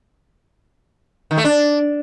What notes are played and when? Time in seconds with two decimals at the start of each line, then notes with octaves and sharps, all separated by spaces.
1.31 D#3
1.38 A3
1.44 D4